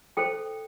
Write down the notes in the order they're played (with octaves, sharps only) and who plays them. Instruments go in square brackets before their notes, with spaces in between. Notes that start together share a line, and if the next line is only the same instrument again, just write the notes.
[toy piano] A4 C5 G5